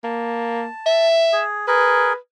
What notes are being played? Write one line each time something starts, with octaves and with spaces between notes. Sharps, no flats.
A#3 A5
E5
G#4
G#4 A#4 B4